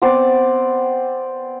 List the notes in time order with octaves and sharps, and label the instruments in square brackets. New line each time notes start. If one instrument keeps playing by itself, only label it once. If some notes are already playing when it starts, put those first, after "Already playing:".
[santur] B3 C4 C5 D5